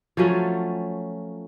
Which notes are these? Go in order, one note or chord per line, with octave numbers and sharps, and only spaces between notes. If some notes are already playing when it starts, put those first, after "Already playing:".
F3 F#3 A3 C#4